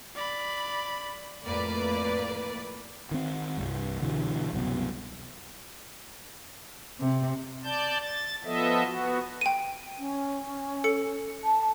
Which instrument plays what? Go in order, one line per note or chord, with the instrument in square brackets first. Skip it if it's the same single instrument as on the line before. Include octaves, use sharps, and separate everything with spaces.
[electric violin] D5 B5
[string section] F2 A2 A#3 B4 D5
[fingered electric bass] D#3 C4
C2 G2
G2 B2 D3 E3
C2 F#2 B2
[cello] C3
[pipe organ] D5 A5 G6
A6
F3 B3 A4 D#5 E5
B3 F#4
[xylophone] G5 D#7
[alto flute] C#4
[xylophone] A4 C#7
[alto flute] A5